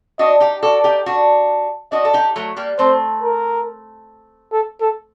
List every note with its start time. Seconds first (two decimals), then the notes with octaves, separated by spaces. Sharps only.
0.19 D4 F#4 D#5
0.40 D#4 G4
0.62 F#4 A4 D5
0.84 D#4 G4
1.06 D4 F#4
1.92 D4 F#4 D#5
2.05 A4
2.13 D#4 G4
2.36 F#3 A3
2.57 G3 A#3
2.78 A3 C4 C5
3.22 A#4
4.52 A4
4.81 A4